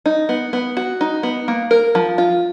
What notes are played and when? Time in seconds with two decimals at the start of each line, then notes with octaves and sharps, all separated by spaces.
0.06 D#4
0.29 B3
0.53 B3
0.77 F#4
1.01 D#4
1.23 B3
1.48 A#3
1.71 A#4
1.95 F3
2.18 F4